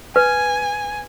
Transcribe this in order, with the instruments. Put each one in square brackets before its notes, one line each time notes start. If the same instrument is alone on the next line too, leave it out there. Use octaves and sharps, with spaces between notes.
[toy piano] B4 [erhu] G#5